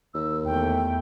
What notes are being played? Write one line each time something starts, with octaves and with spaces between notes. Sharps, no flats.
D#2 E6
E2 A3 G5